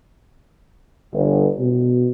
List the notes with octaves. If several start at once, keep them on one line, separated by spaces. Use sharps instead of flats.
G1
B2